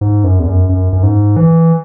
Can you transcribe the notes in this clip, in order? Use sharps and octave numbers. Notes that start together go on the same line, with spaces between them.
G#2
F#2
E2
F#2
F#2
F#2
G#2
E3